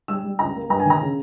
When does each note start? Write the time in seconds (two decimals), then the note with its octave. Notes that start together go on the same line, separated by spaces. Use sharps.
0.08 G3 E6
0.24 G3
0.39 C#2 A#5
0.54 A#3
0.69 G2 A#5
0.79 G#5
0.85 D#3
0.90 A#5
1.01 C#3